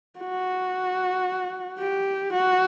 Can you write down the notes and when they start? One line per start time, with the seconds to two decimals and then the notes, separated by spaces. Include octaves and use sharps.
0.20 F#4
1.79 G4
2.33 F#4